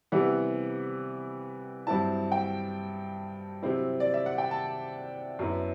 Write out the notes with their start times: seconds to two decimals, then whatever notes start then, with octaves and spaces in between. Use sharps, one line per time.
0.12 C3 E3 G3 B3 E4 F#5
1.87 G2 F#3 C4 E4 A5
2.32 G5
3.63 C3 F#3 C4 E4
4.00 D5
4.14 E5
4.26 F#5
4.38 G5
4.51 A5
5.39 F#2 F#3 B3 E4